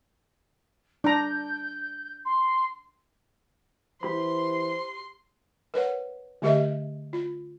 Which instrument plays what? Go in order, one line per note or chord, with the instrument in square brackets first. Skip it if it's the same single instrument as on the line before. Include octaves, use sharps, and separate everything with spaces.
[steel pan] D4 A#5 [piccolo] G6
[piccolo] C6
[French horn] E3 [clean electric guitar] G4 B5 [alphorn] C5 [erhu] C6
[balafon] A#4 B4 C#5 F#5
D3 A3 G4 A#4 D#5 E5
F4